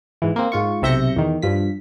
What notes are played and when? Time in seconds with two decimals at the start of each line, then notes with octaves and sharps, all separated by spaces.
0.22 G#2 E3
0.36 A#3 C4
0.52 G#2 F4 C#6
0.82 B1 C3 E5 G6 A#6 C#7
1.16 E2 D#3
1.42 G2 F3 B6